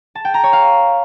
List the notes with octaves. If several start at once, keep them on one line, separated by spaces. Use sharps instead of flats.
A5
G5
A#5
C#5
F5